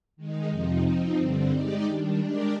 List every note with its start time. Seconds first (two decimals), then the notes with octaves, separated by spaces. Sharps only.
0.17 D#3 G#3 D#4
0.50 F2 C3 F3 C4 D#4
0.83 F3 C4 D#4
1.17 G2 D3 G3 C4
1.51 G#3 D#4 G4 D5
1.85 D#3 G3 D4
2.18 G#3 D4 G4 A#4 D5